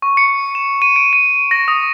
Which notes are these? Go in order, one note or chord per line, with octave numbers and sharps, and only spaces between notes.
C#6
C#7
E7
D#7
D7
D#7
A#6
D#6